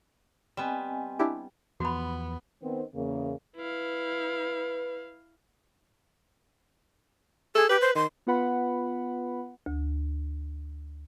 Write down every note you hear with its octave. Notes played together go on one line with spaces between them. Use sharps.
G3 B3 C4 D#5 G#5
D4 E4 G4
E2 E3 F3 B3 F#4 B5
D#3 B3 C4
E2 C#3 A#3
E4 B4 F5
G#4 A4
G4 B4
C5
D#3 C6
B3 F4 B4 F#5 B5
D2